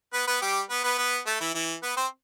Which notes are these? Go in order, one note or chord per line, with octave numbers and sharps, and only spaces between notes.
B3 B4
B3 B4
G3 G4
B3 B4
B3 B4
B3 B4
A3 A4
E3 E4
E3 E4
B3 B4
C4 C5